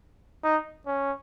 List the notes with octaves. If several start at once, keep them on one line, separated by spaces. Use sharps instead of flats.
D#4
C#4